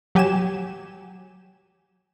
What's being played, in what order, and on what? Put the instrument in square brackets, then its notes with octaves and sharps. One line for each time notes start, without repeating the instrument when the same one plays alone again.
[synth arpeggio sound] F#3 G4 G#5 G#6 E7